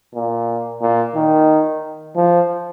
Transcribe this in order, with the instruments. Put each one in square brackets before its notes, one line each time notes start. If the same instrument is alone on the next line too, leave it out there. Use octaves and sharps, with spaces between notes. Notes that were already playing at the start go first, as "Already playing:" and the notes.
[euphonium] A#2
A#2
D#3
F3